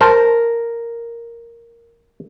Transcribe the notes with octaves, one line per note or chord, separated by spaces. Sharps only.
A#4 C5 A5